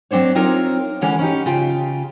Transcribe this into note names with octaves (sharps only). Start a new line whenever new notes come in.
F#3 C4 D4 C5 C#5
C4 D#4 F4 A#4 C#5
D3 E3 G#3 C#4
C#4 D#4 G4
C#3 F4 G5